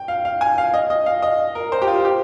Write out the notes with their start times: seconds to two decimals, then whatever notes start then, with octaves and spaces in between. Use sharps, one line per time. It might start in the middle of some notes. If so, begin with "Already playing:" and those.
Already playing: G5
0.08 F5
0.25 F5
0.41 G#5
0.58 F5
0.74 D#5
0.90 D#5
1.06 F5
1.22 D#5
1.55 A#4
1.72 C5
1.82 G4
1.88 F4
2.05 G4